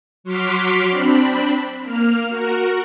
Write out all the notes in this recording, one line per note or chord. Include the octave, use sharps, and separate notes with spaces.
F#3 F#4 C6 D6 F6 B6
C4 D4 B5
A#3 F6
F#4 A#4